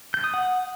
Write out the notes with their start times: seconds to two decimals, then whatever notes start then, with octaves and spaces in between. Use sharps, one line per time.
0.14 G6
0.24 D#6
0.34 F#5